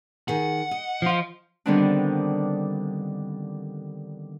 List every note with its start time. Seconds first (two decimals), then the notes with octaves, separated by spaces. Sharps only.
0.28 D#3 G#4 F#5
0.71 D#5
1.02 F3 F4
1.66 D3 D#3 G3 B3 C4 D4